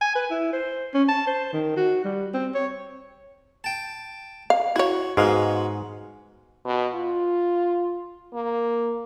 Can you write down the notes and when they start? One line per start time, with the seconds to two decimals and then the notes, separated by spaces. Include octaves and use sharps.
0.01 G#5
0.15 B4
0.30 E4
0.53 C5
0.94 C#4
1.09 A5
1.27 C5
1.53 D#3
1.77 F#4
2.05 G3
2.34 C4
2.55 C#5
3.64 G5 A5
4.50 F5
4.76 E4 F#4 C#5
5.17 G#2 G#3 B3 C#4 F#4 F5
6.65 B2
6.95 F4
8.34 A#3